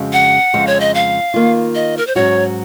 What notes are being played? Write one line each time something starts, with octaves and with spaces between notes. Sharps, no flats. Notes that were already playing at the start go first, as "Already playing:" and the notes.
Already playing: F2 C#3 G#3 C4 F#4
F#5
F2 C#3 G#3 C4
C#5
D#5
F5
D#3 A#3 F4
D#5
A#4
C5
G#2 F#3 C#4 F#4 C#5